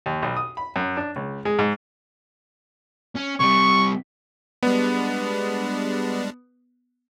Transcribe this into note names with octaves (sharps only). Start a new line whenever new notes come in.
D#2
B1
D#6
B5
F#2
D4
C#2
G#3
G#2
C#4
C3 G3 C#6
G3 G#3 B3 D4